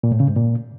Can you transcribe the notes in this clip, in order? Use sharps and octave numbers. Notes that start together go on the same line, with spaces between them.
A#2
A2
C#3
G#2
A#2